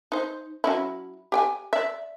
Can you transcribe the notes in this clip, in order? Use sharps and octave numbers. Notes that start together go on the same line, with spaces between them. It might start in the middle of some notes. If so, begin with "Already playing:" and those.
D#4 C5
F#3 C#4 E4
G4 G5 G#5
D5 E5